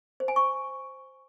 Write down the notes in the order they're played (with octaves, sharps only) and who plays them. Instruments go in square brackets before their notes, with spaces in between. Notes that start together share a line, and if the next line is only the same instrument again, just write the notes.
[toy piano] C5
G#5
C#6